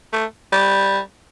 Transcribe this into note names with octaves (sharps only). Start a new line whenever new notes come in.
A3
G3